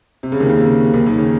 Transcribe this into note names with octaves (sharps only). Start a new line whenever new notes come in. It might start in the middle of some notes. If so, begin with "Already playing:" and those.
C3
C#3
D#2 D#3
C#3
C3
D#2 D#3
D#2 D#3
C#3 C#4